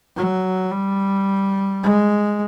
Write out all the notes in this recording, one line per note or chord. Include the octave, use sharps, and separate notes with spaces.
F#3
G3
G#3